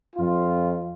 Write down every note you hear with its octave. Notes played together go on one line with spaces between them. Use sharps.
F2 F4